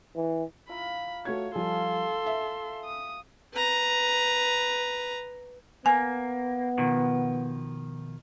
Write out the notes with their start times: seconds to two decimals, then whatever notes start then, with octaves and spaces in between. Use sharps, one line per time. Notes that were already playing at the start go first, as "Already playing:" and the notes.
0.16 E3
0.69 E4 F4 A#5 B5
1.25 A3 F#4 C#5 G#6
1.55 F3 G3 A4 F5 G#5 C6
2.26 E5
2.84 D#6
3.53 B4 A#5
5.86 A#3 B3 G#5
6.78 B2 D#3 F3